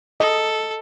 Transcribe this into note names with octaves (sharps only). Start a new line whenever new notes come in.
A4 D#5